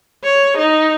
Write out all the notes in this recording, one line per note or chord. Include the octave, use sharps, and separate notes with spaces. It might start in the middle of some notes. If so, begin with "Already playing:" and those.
C#5
D#4